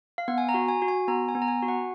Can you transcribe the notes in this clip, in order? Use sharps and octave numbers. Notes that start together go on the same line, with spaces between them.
F5
B3 F#5
G#5
A#5
F#4
G#5
F#4
G#5
B3 A#5
G#5
B3
A#5
G#5
F#4
F#5